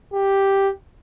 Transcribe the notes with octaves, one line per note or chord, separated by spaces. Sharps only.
G4